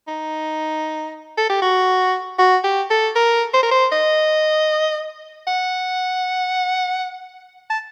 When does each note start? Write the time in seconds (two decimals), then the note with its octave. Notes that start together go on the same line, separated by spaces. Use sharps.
0.08 D#4
1.38 A4
1.50 G4
1.62 F#4
2.39 F#4
2.64 G4
2.90 A4
3.15 A#4
3.54 C5
3.63 A#4
3.71 C5
3.92 D#5
5.47 F#5
7.70 A5